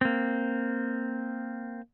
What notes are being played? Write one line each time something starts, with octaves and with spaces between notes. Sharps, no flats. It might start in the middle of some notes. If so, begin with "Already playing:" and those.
A#3 C4